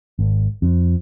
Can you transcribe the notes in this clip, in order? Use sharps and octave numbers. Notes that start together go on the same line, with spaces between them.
G#1
F2